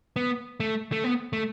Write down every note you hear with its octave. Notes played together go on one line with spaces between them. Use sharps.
B3
A3
A3
B3
A3